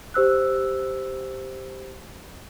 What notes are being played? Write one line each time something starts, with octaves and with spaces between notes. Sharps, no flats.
G4 C5 E6 F#6